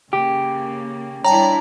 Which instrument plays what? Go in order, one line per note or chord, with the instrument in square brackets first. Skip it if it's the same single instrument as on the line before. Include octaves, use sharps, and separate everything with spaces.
[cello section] C#3 A#3 [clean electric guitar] G4
[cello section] G3 D4 E4 [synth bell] C#5 G5 A5 [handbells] A#5